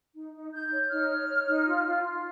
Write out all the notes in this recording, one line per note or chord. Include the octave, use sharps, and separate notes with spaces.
D#4
D#4
D#4 G6
C#5
D#4 F6
C#5
C#5
D#4
F4
F4
F4